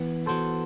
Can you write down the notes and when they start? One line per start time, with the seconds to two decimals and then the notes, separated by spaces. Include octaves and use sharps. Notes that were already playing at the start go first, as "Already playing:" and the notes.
Already playing: E3 B3
0.26 E3 B3 F#4 A4 C5